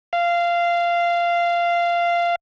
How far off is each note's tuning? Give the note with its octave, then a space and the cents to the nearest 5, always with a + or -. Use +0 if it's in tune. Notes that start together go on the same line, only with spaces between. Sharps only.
F5 -15